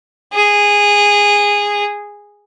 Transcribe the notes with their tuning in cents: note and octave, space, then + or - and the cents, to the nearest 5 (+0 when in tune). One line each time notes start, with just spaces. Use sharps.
G#4 -15